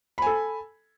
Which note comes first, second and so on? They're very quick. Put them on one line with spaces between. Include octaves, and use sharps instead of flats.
B5 G#5 A4